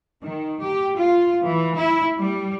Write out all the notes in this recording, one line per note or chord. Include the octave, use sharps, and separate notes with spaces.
D#3
G4
F4
E3
E4
G3